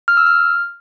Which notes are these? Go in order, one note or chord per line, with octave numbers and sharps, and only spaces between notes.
F6
E6
F6